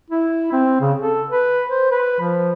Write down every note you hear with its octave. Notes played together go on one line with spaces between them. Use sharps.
E4
C4
C#3
A4
B4
C5
B4
F3